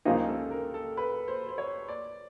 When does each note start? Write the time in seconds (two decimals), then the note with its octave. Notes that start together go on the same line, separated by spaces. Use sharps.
0.05 C#2 C#3 F3 A#3 D#4 G4
0.28 A4
0.51 A#4
0.74 A4
0.97 B4
1.28 C5
1.49 C5
1.58 C#5
1.88 D5